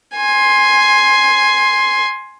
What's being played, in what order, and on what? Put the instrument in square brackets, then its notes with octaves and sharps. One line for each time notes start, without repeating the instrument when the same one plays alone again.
[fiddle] G#5 C6